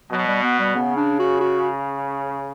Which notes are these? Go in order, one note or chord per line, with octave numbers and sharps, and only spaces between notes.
B2 F#3
G3
B3
G3
C#3 B3
D4
F#4
F#4